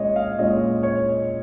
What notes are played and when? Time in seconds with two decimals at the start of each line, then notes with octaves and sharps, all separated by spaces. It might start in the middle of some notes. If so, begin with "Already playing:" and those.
Already playing: A#2 G#3 C#4 C#5 D#5
0.16 F5
0.39 A#2 G#3 C#4 D#5
0.83 C#5